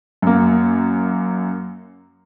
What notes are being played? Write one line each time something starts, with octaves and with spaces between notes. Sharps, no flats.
F#2 A#3